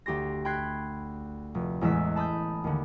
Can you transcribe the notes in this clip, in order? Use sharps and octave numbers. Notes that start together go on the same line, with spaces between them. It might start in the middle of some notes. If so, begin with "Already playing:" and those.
D2 G4 C6 A#6
G5 B5 C6 F#6 G#6 C7
F1
A1 E2 G#3 E6 B6
A5 B5 D#6 G6
D#2 D3